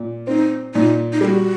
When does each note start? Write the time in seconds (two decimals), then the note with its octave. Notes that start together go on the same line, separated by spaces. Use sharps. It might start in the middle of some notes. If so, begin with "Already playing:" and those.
Already playing: A#2
0.27 C4 D#4
0.74 A#2 D#4
1.13 D#4
1.21 G3 G#4
1.25 F#4